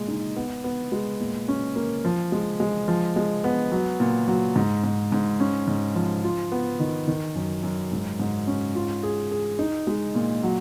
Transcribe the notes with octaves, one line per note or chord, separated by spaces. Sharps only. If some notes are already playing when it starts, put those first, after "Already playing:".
Already playing: A#2 G#3
D#4
B3
B3
G#3
A#2
C#4
A#3
F3
G#3
G#3
F3
G#3
B3
F#3
A#2
F#3
G#2
G#2
G#2
C#4
G#2
F3
F4
B3
D#3
D#3
F#2
F#2
G#2
G#2
C#4
F4
G#4
G#4
D#4
G#3
A#2
F#3